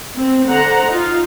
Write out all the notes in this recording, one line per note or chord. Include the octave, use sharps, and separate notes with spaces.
C4
D3 C5 F#5 A#5
D#4 F4